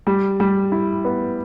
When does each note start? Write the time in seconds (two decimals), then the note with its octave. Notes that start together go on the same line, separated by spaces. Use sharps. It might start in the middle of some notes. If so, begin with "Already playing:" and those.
0.07 G3
0.40 G3
0.72 E4
1.05 B3